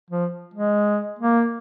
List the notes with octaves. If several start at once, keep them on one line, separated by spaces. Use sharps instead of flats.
F3
G#3
A#3